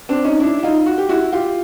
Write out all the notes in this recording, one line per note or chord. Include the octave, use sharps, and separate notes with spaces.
C4 D4
C#4 D#4
D4 E4
E4
D#4 F4
F#4
G4
E4 F#4
F4 G4